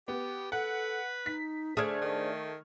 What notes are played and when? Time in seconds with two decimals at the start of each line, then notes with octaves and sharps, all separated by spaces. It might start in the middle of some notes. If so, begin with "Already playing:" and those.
0.08 B3 G4
0.52 A4 B4 F#5
1.26 D#4 B6
1.77 D3 A3 D4 G#4 C5 F6 G#6
2.01 D#3